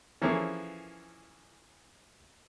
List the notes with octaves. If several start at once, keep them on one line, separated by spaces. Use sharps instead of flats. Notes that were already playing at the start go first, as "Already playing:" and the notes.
E3 F3 A#3 C#4 G#4 A4